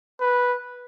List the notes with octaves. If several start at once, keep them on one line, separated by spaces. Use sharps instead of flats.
B4